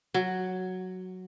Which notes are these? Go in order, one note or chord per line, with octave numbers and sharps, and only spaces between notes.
F#3